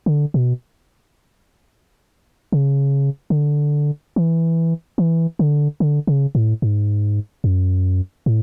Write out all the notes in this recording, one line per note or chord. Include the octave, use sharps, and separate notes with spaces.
D3
B2
C#3
C#3
D3
E3
E3
D3
D3
C#3
A2
G#2
F#2
A2